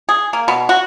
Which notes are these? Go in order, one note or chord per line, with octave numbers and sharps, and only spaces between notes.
G#4
A#3
B2
F#4